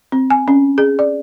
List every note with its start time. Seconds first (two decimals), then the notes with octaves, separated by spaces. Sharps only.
0.12 C4
0.30 G#5
0.48 C#4
0.78 G#4
0.99 D5